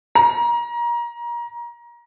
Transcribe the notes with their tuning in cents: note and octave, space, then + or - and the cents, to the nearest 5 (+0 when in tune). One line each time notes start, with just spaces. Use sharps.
A#5 +25